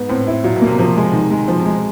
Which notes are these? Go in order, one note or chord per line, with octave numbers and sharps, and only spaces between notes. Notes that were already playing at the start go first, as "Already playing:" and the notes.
Already playing: G#2 B3
A2 C4
E4
A#2 F#3
B2
A#3
C3
C3 F3
G#3
D#3
G#3
B2 F3
C3
G#3